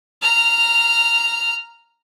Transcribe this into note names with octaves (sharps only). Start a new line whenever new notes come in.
A#5 F6